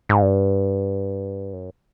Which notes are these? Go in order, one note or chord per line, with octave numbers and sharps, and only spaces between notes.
G#2
G2
F#2